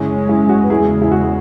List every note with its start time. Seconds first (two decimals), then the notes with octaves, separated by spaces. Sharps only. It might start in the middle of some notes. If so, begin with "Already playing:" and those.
Already playing: F#2 C#3 G#3 C#4 E4
0.29 E4
0.49 F#4
0.64 B4
0.70 E2 C#3 G#3 E4 G#4
1.02 E4
1.12 F#4